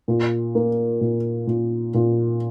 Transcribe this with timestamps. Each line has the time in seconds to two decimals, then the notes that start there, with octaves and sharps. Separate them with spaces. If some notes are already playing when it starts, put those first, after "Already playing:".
0.08 A#2
0.55 A#3
1.01 A#2
1.47 A#2
1.94 A#2